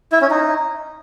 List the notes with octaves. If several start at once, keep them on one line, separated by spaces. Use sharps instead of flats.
E4
C#4
D#4